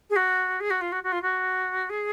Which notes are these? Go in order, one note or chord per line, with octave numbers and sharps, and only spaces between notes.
G#4
F#4
G#4
F#4
F4
F#4
F#4
F4
F#4
G#4